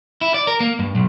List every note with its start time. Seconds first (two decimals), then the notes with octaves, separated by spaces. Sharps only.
0.21 E4
0.34 D5
0.47 A#4
0.60 A#3
0.79 G2
0.95 B1